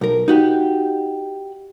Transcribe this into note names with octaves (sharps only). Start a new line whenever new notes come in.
B1 A#4
D#4 F#4 G4